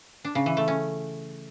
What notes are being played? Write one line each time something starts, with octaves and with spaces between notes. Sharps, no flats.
D4
C#3
E3
A3
C#4